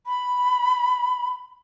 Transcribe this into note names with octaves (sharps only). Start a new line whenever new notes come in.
B5